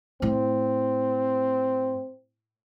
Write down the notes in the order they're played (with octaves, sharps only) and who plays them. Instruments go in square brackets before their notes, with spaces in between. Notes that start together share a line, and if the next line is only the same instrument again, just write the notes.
[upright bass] A2 [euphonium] C4